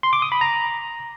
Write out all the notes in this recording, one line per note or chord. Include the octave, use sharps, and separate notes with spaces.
C6
D6
D#6
B5
A#5